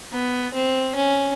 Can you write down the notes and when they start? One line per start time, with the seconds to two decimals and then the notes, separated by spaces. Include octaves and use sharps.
0.12 B3
0.54 C4
0.95 C#4